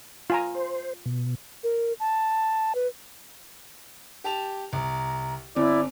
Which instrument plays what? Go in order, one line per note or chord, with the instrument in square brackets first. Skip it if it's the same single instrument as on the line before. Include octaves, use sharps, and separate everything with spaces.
[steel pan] F4 G#5 A#5
[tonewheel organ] C5
B2
[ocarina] A#4
A5
B4
[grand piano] G4 A5 F7
[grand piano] C2 [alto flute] A#5
[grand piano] G1 [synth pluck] C4 [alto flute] E4 [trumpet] D5